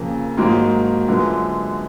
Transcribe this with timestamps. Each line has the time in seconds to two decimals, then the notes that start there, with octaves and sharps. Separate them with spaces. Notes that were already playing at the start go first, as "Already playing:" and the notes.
Already playing: F2 C#3 F3 A#3
0.37 G#2 D#3 F#3 A#3
1.08 F#2 D3 F3 G#3 B3